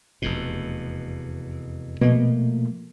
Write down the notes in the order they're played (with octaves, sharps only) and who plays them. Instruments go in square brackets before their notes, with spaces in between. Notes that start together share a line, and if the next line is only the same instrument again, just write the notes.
[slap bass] F1 E2 B2
[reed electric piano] B2 [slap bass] F3 A3 A#3